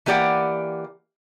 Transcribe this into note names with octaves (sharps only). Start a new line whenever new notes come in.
E3 A#3 G4 D5 F#5